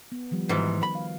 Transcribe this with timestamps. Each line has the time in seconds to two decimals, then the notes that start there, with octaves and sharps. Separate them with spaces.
0.12 B3
0.31 D#3 F3 G3
0.49 G#2 D#3 E3 F#4 B4
0.83 B5
0.95 F5